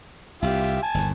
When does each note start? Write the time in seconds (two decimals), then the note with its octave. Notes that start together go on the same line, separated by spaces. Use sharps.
0.42 C2 F4 G4 E5
0.83 G#5 A5
0.94 G1 D#2